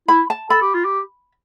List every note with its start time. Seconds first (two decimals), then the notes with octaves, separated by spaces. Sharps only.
0.08 E4 B5
0.30 A5
0.50 A4 B5
0.62 G4
0.74 F4
0.85 G4